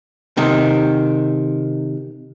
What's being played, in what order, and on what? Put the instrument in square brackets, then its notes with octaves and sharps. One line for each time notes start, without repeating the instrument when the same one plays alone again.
[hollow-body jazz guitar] C3 D#3